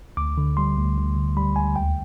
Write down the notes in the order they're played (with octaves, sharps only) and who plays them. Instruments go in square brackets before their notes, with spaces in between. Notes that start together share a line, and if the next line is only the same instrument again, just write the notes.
[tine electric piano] D2 D6
D3
G3 C6
D2
D2
D3
G3 B5
D2 G#5
D#2 G5